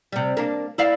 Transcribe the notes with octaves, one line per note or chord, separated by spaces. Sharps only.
C3 G3
A#3 D4
E4 D5 F5